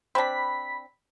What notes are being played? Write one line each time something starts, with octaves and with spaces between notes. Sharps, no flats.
C4 D4 B5 B6